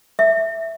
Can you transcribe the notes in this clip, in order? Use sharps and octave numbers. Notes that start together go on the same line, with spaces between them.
E5